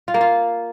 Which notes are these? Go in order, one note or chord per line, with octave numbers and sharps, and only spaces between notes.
F4
A#3
F4